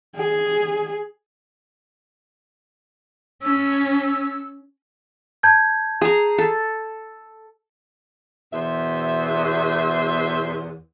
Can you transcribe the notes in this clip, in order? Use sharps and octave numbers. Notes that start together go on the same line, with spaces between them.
G#4
C#4 E6
A5 G6 G#6
G#4 A#5
A4
E2 B2 C5 E5